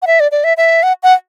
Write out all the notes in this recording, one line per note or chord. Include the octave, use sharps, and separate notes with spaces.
F#5
E5
D5
D5
E5
E5
F#5
F#5